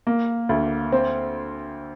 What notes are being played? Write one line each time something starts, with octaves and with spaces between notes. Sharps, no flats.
A#3
D2
C4